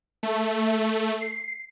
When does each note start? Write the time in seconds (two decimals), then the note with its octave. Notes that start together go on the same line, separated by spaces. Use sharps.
0.23 A3
1.20 C7